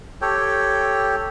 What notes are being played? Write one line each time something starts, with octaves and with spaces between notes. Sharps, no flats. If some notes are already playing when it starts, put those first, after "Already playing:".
G4 A4 C#5 G5